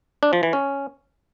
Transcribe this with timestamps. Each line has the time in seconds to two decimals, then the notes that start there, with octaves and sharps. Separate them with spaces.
0.23 D4
0.33 F3
0.43 E3
0.53 C#4